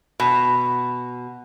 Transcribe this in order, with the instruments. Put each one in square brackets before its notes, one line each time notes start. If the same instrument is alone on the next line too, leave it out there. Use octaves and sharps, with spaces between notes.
[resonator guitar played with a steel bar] B2